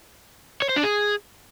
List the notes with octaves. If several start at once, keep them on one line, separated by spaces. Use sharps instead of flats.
C#5
C5
D4
G#4